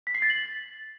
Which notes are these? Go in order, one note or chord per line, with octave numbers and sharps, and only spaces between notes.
B6
C7
A6
F#7